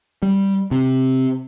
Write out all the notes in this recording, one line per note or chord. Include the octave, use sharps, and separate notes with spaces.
G3
C3